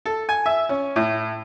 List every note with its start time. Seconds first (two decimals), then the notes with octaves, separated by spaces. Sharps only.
0.06 A4
0.29 G#5
0.46 E5
0.69 C#4
0.96 A2